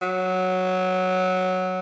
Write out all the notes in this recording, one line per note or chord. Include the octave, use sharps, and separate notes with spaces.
F#3